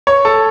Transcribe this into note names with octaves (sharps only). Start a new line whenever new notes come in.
C#5
A4